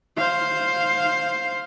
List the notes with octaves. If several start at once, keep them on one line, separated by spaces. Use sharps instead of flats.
C5 F5